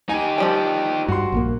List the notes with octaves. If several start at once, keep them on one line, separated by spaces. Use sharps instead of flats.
D#4 G4 G#5
F3 G3 G5
G2 F#4 C6
A#1 A#2 A#3